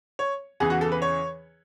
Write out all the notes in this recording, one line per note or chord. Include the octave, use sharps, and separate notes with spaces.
C#5
E2 C#3 E3 G#4
F#4
A4
B4
C#5